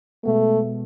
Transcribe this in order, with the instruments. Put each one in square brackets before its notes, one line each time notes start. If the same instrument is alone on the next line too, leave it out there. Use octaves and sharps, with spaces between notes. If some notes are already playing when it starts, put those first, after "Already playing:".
[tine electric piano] B2 G#3 B3 [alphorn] A3